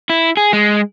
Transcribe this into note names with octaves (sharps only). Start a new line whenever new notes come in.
E4
G#4
G#3